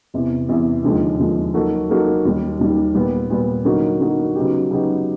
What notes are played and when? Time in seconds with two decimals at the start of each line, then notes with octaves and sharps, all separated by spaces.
0.14 E2 C3 E3
0.49 E2 C3 E3
0.84 D#2 D3 F3 G#3
1.19 D#2 D3 F3 G#3
1.54 F#3 A#3 D#4 F#4 A4
1.89 F#3 A#3 D#4 F#4 A4
2.25 D#2 D#3 G3
2.59 D#2 D#3 G3
2.95 A#2 G3 B3
3.30 A#2 G3 B3
3.65 D3 F#3 A#3 D#4 F#4
4.00 D3 F#3 A#3 D#4 F#4
4.35 C#3 F#3 B3 D#4 G4
4.71 C#3 F#3 B3 D#4 G4